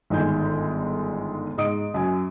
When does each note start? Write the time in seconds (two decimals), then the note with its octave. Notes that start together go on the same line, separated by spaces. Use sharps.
0.10 G1 G#2 D#3 D#5 G#5 G6
1.58 G#2 D#5 D#6 D7
1.94 F#2 G#5